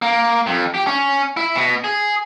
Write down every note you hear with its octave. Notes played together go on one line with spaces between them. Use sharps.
A#3
F2
G4
C#4
E4
B2
G#4